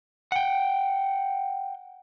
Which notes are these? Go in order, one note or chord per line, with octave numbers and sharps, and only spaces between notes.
F#5 G5